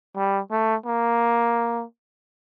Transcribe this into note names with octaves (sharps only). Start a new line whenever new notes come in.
G3
A3
A#3